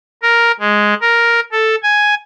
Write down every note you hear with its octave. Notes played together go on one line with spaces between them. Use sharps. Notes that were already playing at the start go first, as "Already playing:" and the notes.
A#4
G#3
A#4
A4
G#5